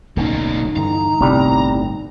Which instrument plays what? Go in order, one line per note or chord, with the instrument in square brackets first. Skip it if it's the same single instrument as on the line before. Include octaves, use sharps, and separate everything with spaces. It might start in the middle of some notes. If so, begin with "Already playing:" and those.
[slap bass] D1 B1 C#4 [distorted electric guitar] B2 A#3 [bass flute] D#4
[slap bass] G2 D3 E3 [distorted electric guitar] A#5
[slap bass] G1 A2 B3 [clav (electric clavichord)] C2 G3